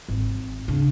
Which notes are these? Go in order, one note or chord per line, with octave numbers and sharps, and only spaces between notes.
G#1
C#3 D4